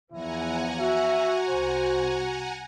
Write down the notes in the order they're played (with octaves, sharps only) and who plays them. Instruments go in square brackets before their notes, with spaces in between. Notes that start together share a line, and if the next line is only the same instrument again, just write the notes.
[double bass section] E2 F3 [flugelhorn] E4 [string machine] F#5 G#5 A#5
[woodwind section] F#4 [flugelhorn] E5
[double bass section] C2 [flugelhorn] C5